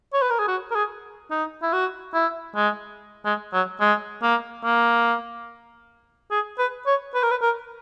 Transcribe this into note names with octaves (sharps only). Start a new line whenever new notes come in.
C#5
B4
A#4
G#4
F#4
A#4
G#4
D#4
E4
F#4
E4
G#3
G#3
F#3
G#3
A#3
A#3
G#4
B4
C#5
B4
A#4
B4
A#4